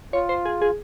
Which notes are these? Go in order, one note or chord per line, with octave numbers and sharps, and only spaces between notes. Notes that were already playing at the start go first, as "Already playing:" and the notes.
F4 C#5
C5
G#4
G#4